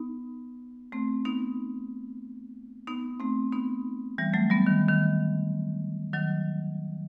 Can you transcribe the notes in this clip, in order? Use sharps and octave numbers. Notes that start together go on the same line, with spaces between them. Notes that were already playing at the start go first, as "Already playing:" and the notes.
Already playing: B3 D#4
A3 C4
B3 D#4
B3 D#4
A3 C4
B3 D#4
E3 G3
F#3 A3
G3 B3
D#3
D#3
D#3 F#3